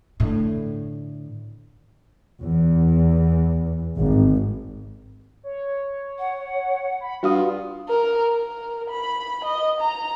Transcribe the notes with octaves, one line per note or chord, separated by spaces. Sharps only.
A2 D3
E2
G#1
C#5
F#5
B5
G2 F4 F#4 F5 D#6
A#4
A#4
B5
D#5
A#5